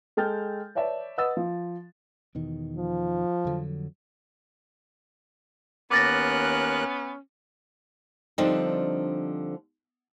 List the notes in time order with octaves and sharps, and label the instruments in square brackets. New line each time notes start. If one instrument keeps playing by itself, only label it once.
[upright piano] G#3 A4 G5 F6 G6 A6
B4 C#5 D5 E5 A5
B4 D#5 F#5 D#6 E6 A6
F3
[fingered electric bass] E2 B2 D#3
[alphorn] F3
[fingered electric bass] F2 D3 F#3
[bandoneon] D#2 A#4 F#6 [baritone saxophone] B3 [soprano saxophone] C#4 [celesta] D6 A6 A#6
[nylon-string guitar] D3 F3 G3 C4 D4 D#4